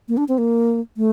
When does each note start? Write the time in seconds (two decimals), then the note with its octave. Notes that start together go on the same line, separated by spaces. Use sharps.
0.08 A#3
0.17 D4
0.28 C4
0.38 A#3
0.97 A3